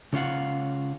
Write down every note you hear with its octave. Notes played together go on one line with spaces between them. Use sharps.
C#3 C#4 F4 F5 F#5